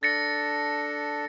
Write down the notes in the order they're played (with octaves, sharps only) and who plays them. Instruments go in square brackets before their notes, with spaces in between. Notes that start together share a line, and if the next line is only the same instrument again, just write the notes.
[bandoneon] D4 A4 [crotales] A6 A#6 C#7